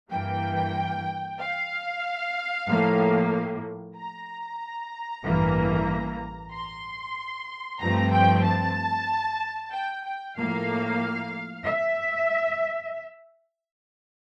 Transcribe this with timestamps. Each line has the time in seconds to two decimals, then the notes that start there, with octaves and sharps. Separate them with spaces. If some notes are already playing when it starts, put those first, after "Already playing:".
0.11 G2 E3 A#3 G5
1.39 F5
2.67 A2 F3 A#3
3.96 A#5
5.23 A1 G2 E3 A#3
6.52 C6
7.79 G2 F3 A3 C4 A#5
8.12 G5
8.44 A5
9.72 G5
10.05 G5
10.36 A2 F3 A#3 F5
11.64 E5